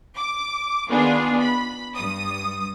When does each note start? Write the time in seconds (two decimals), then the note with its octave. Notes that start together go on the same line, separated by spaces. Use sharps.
0.18 D6
0.89 D#3 B3 D4 F4 G#4
1.41 B5
1.95 G2 D#6